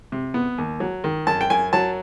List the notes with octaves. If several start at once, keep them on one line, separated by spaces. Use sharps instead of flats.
C3
B3
D#2
F#3
D#3
F#2 A5
G5
F#2 G#5
F#3 A5